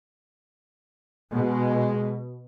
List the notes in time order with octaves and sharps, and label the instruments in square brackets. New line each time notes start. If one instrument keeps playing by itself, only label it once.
[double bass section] B2 [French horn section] G#3